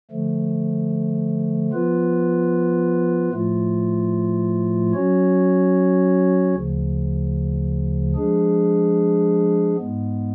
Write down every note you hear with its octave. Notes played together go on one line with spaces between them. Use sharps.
D3 F3 A3
F3 B3 F4 B4
A2 F3 A3 F4
F#3 C#4 F#4 C#5
D2 C#3 F3
F3 G#3 D4 G#4
G#2 G#3 B3